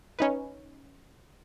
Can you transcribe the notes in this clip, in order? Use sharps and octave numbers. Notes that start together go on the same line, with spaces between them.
C#4 D#4 B4